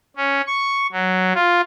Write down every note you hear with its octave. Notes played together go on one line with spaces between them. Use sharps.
C#4
C#6
F#3
F4